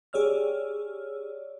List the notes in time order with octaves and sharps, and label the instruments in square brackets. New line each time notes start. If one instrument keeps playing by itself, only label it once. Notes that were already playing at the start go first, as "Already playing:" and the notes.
[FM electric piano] G4 G#4 C#5 D5 E6 F6